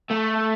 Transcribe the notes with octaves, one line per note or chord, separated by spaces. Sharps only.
A3